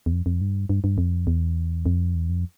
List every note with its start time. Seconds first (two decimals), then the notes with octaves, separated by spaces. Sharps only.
0.06 E2
0.12 F2
0.26 F2
0.41 G2
0.69 G2
0.84 G2
0.98 F2
1.27 E2
1.86 F2
2.15 E2
2.29 F2